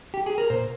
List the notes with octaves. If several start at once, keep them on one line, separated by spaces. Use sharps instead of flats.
G4
G#4
A#4
A#2 C5